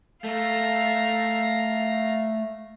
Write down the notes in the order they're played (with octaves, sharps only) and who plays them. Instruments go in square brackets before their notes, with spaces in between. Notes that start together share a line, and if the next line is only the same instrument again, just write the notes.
[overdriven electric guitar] A3 [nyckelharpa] F5 A#5